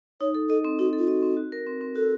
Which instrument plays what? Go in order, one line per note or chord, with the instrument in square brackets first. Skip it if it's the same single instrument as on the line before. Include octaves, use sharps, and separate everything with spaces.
[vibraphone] D#4 [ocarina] C#5
[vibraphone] A4
[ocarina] A4 [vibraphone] D#5
[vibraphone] C4
[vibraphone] D#4 [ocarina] F#4
[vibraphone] A4
[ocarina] F4
[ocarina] F#4 [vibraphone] D#5
[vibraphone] C4
F#4
A#4
C4
C4
[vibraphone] F#4 [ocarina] A4